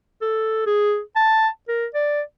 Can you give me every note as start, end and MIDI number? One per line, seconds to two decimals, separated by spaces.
0.22 0.63 69
0.66 1.00 68
1.16 1.48 81
1.68 1.86 70
1.94 2.21 74